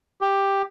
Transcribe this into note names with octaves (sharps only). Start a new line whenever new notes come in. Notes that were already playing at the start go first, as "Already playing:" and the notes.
G4